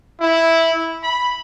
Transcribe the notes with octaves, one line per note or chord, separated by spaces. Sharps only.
E4
B5